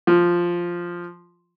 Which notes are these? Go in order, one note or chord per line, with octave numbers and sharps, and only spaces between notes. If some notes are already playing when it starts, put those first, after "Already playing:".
F3